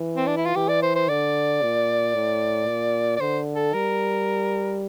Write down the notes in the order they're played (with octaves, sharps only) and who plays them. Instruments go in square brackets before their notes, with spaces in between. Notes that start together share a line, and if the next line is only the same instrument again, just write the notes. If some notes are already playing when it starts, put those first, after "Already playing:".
Already playing: [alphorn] E3
[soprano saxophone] C4
D4
E4
F4
[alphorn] E3 [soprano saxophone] G4
[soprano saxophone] D5
C5
C5
[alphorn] D3 [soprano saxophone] D5
[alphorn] A#2
A2
A#2
[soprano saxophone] D5
[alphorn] D3 [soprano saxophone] C5
[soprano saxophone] A4
[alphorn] G3 [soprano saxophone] A#4